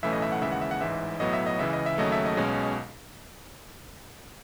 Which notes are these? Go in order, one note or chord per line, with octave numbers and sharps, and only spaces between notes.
B1 A2 E3 A3 C#4 E5
D#5
E5
F#5
D#2 C#3 E3 G#3 E5
F#5
E5
F#5
A1 G#2 E3 E5
B1 A2 F#3 B3 D#5
E5
D#5
C#2 C#3 E3 E5
D#5
E5
D#2 C#3 F#3 A3 D#5
E5
D#5
B1 B2 G#3 C#4